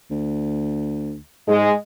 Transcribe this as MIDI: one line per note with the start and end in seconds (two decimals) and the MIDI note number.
0.11 1.17 38
1.48 1.70 44
1.48 1.71 56